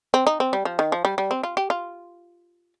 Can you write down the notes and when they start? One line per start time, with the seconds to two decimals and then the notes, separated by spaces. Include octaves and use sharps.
0.14 C4
0.27 D#4
0.40 C4
0.53 G3
0.65 F3
0.79 D#3
0.92 F3
1.05 G3
1.18 G3
1.31 C4
1.43 F4
1.57 G4
1.70 F4